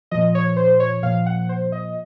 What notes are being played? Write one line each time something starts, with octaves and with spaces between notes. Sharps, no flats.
A#2 F3 D#5
C#5
C5
C#5
A#2 F3 F5
F#5
C5
D#5